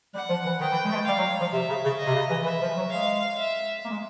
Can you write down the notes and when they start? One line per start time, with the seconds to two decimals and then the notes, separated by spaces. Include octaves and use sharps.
0.14 G3 F#5
0.29 F3
0.45 E3
0.60 D#3 G5
0.72 E3
0.84 G#3
0.90 A3
0.94 G#3
1.07 G3 F5
1.18 F#3
1.41 F3
1.53 C3 E5
1.68 C#3
1.84 C#3
1.99 D#5
2.07 C3
2.14 C#3
2.30 E3
2.45 E3 E5
2.62 F3
2.77 F#3
2.92 G#3 F5
3.39 E5
3.85 A#3
3.90 G#3